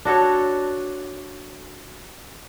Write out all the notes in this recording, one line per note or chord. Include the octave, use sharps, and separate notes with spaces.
D4 F#4 A4 C#5